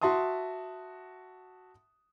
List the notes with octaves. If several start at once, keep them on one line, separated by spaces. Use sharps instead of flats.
F#4 E5 A5 C6 D#6